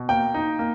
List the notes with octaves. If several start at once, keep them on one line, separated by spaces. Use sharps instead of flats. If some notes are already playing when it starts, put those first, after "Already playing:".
Already playing: B2
A#3 G5
D#4
A#3